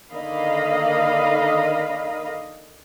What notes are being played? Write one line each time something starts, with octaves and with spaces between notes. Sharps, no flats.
D3 D#3 A#3 D#5 F5 B5